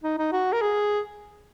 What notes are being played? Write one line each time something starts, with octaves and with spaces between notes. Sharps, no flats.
D#4
D#4
F#4
A#4
G#4